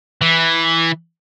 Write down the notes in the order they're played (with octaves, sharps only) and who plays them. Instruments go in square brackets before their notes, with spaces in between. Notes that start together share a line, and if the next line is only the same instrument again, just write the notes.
[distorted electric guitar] E3